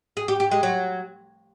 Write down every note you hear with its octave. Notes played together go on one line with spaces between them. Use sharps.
G#4
G4
G4
G#3
F#3